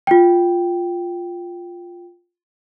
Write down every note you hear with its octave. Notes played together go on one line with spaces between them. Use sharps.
F4 G5